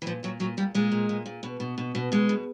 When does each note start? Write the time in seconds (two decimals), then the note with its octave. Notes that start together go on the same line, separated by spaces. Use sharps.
0.02 E3
0.06 A#2 F3
0.23 A#2 F#3
0.40 A#2 F#3
0.57 A#2 G3
0.75 A#2 G#3
0.92 A#2
1.09 A#2
1.26 A#2
1.43 B2
1.60 B2
1.78 B2
1.95 B2
2.12 B2 G#3
2.29 B2